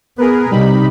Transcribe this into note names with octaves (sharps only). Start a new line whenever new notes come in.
B3 G#4 A#4 B4
C3 G3 D#4 B5